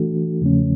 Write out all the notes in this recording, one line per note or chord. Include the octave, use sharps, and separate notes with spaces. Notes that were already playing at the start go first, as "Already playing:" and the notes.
Already playing: E3 A3 D4 F#4 A4
E2 C#3 F3 A3 C#4